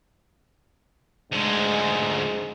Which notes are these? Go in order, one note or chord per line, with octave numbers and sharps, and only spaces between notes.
D2 G#2 G#3